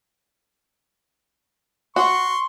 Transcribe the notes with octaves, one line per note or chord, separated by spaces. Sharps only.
F#4 C6 C#6